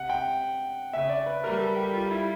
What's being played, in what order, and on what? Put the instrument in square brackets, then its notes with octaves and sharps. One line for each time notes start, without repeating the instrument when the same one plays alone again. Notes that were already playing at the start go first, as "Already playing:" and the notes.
Already playing: [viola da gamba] C3 [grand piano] F#5
[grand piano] G5
[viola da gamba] C#3 [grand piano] E5
[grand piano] D5
B4
[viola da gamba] G3 [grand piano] A#4
[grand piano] A4
G4
F4
E4